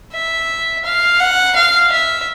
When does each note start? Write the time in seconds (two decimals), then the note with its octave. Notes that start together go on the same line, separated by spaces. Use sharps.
0.14 E5
0.85 F5
1.20 F#5
1.56 F5
1.92 E5